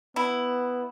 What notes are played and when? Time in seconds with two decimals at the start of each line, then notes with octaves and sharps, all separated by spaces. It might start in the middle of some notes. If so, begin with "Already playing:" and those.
0.16 B3 E4